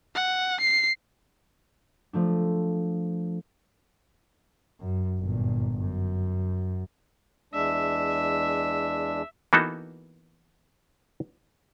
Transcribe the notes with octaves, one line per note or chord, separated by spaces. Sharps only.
F#5
C7
F3 A3 D4
F#2
G1 A#2
F#2
E2 G#3 D4 E5
E3 A#3 B3 D#4 F#4 A4